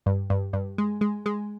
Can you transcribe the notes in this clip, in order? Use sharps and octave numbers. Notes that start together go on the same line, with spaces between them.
G2
G2
G2
G#3
G#3
G#3